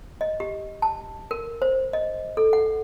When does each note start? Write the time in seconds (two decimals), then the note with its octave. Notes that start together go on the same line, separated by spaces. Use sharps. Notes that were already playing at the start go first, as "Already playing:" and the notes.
0.21 D#5
0.40 G4
0.82 A5
1.31 A#4
1.62 C5
1.93 D#5
2.37 A4
2.53 F#5